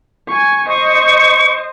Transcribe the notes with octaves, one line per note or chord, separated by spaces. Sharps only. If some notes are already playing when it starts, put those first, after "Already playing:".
G#5 C#6
C5 D#5 C#6